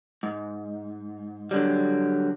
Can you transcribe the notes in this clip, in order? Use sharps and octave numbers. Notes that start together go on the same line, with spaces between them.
G#2
D3 F#3 G3